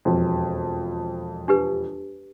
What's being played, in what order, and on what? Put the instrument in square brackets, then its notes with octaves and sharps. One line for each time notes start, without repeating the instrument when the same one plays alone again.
[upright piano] E1 F2
[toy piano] D4 G4 B4